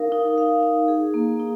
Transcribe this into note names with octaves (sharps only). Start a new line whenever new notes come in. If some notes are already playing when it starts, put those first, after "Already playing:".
Already playing: D#4 A#4 F5
D#4
F5
D#4
G#4
A#3
D#4